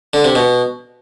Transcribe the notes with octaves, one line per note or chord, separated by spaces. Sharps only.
D3
C3
B2